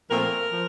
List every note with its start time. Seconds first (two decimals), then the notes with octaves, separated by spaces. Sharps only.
0.10 A#2 F3 A3 C4 A#4
0.52 F3